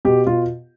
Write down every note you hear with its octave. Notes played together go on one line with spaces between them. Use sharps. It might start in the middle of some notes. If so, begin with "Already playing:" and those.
B2 G4
B2 F4